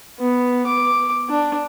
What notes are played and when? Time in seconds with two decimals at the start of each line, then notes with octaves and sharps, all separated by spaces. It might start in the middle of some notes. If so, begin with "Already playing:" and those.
0.19 B3
0.67 D6
1.29 D4